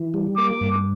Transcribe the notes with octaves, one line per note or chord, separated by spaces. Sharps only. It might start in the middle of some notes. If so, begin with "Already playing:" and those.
Already playing: E3
G3
A#3 D6
G2